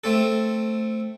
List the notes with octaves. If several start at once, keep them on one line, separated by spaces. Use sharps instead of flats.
A3 C4 A4